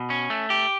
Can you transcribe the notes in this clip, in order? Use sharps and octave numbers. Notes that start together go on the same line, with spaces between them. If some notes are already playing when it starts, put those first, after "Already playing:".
Already playing: B2
C#4
A3
G4